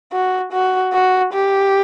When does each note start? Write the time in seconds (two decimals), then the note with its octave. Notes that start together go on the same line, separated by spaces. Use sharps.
0.13 F#4
0.52 F#4
0.93 F#4
1.33 G4